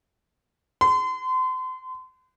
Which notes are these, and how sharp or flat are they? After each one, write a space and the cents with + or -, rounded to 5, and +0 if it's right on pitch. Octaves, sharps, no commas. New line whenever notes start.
C6 -35